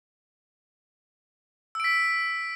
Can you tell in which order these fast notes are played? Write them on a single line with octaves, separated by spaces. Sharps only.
E6 D7 B6